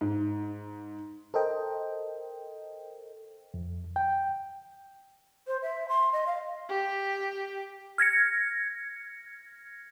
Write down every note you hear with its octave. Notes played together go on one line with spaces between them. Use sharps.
G#2
A4 A#4 C5 D#5 G5
F2
G5
C5
E5
C6
D#5
F5
G4
F6 G#6 A#6 C#7